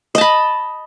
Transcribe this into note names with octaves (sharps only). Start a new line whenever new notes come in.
D#5 A5 B5